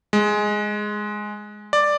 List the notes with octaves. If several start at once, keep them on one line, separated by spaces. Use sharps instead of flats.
G#3
D5